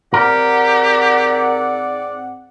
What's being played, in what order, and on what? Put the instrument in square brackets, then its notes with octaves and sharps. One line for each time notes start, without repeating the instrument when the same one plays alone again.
[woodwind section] G#2 C4 F#5 [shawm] G4 [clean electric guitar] A#4 [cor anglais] D5